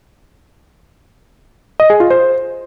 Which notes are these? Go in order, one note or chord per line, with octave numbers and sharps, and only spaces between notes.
D#5
G#4
F4
C5